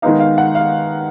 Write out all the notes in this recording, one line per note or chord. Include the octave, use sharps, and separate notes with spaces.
D#3 G#3 B3 D#4 F5
F5
F#5
F5